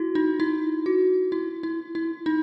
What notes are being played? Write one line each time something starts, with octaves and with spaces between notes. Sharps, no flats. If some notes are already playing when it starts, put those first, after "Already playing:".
Already playing: E4 F#4
D#4
E4
F#4
E4
E4
E4
D#4